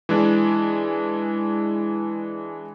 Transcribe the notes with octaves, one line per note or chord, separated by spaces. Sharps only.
E3 G#3 D4